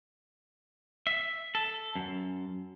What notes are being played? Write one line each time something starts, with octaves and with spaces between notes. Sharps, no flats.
E5
A4
F#2